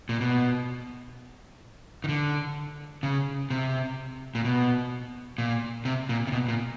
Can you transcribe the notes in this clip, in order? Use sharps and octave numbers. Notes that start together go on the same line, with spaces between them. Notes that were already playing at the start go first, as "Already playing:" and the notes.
A#2
B2
D#3
D3
C#3
C3
A#2
B2
A#2
C3
A#2
C3
B2
A#2